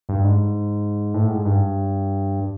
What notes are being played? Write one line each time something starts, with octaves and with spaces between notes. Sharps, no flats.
G2
G#2
A2
G#2
G2